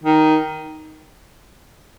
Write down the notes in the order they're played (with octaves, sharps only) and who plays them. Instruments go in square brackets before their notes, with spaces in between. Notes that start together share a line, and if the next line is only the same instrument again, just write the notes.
[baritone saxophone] D#3